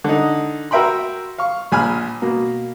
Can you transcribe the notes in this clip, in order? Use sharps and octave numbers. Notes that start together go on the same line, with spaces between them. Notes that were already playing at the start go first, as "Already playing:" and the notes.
D3 D#4
F#4 A#4 E5 G5 B5 C6
F5 C#6
A#1 G#5 B5 F6
B2 A#3